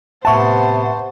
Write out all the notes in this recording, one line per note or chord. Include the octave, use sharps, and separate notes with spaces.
A2 C3 B3 C5 E5 F#5 A5 C#6